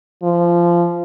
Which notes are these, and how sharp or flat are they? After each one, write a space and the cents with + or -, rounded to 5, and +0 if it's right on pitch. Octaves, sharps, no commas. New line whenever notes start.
F3 -20